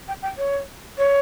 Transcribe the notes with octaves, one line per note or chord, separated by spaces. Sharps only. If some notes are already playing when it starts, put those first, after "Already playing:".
G5
G5
C#5
C#5